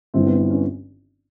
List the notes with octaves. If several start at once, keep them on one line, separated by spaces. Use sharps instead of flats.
G1 G2 E3 C4
B3
C4
C#4